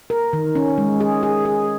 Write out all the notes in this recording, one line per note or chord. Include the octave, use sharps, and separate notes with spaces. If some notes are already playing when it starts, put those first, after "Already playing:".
A#4
D#3
C#4
G#3
G#4
G#4
G#4